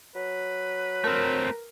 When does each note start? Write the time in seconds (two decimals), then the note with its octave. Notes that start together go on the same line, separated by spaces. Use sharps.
0.15 F#3 B4
1.04 A3 C4 A#4